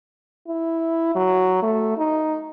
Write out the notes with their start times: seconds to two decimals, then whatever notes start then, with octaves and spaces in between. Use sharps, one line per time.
0.48 E4
1.16 F#3
1.63 A3
1.98 D#4